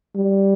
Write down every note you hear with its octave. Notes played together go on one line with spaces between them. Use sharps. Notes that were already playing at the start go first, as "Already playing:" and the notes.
G3